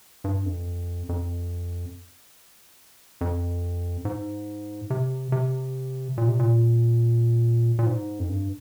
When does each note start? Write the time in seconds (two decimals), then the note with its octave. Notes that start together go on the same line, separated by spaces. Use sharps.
0.24 G2
0.46 F2
1.09 F2
3.21 F2
4.05 G#2
4.90 C3
5.32 C3
6.18 A#2
6.28 C3
6.39 A#2
7.79 A#2
7.86 G#2
8.19 F2
8.29 G2